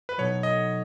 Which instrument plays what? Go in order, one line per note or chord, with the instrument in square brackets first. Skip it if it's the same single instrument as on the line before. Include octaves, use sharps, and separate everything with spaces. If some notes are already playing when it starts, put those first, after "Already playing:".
[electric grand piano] B4
[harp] B2 F#3 B3 D#4 A4 [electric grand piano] C#5
[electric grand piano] D#5